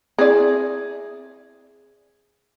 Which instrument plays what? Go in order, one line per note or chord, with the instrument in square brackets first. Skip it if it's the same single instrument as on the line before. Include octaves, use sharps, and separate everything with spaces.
[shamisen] C4 E4 D5 [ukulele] G#4